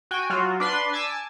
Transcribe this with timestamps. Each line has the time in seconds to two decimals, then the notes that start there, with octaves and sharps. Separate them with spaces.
0.11 F#4 G5 G#5
0.30 F#3 F4 F#4
0.60 D4 B4 C6
0.93 G#5 A5 D6 E6